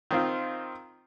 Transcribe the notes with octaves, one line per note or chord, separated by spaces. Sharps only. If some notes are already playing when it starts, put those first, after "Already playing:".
D#3 C4 F4